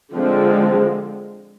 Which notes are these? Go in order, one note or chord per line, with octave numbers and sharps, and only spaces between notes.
D3 F3 G#3 C4